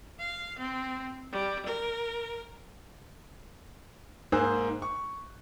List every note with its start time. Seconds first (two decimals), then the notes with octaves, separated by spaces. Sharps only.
0.19 F5
0.58 C4
1.32 G3
1.65 A#4
4.32 G#2 A#3 G#4 C5 E6 F#6
4.82 C#6